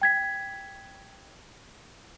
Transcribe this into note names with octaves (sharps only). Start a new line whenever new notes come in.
G5 G#6 B6